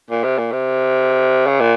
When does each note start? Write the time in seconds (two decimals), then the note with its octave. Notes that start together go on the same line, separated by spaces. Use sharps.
0.10 A#2
0.24 C3
0.38 A#2
0.52 C3
1.47 C#3
1.61 A#2